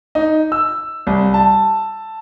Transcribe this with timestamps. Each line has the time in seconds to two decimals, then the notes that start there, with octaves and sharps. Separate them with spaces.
0.15 D#4
0.52 E6
1.07 C2
1.34 A5